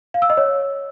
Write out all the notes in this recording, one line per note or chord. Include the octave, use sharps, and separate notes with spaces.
F5
E6
D#5
C#5